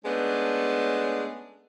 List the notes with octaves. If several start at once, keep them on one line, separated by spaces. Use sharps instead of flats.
G#3 A3 B3 C#4 D4